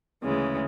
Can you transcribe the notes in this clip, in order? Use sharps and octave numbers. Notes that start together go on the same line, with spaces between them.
D2 C#3 E3 G#3